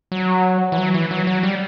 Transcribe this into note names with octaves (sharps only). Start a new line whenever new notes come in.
F#3
E3
F#3
E3
F#3
F#3
G3